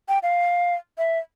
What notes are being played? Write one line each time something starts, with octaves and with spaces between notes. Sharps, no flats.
G5
F5
E5